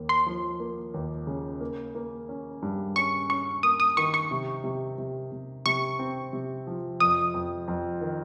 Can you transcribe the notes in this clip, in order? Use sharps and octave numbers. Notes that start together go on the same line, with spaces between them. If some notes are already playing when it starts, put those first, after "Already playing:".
Already playing: D#2 A#3
C6
F3
A#3
D#2
C#3
A#3
A#3
C#4
G2
C#4 C#6
C#4 C#6
A#3 D#6
D#6
D#3 C#6
C#6
C3
C3
C3
C3
C3 C#6
C4
C3
F3
F2 D#6
F2
F2
D#3